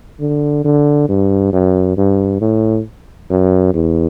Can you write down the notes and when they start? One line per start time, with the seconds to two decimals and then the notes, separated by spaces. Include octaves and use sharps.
0.20 D3
0.64 D3
1.09 G2
1.53 F#2
1.97 G2
2.41 A2
3.30 F#2
3.74 E2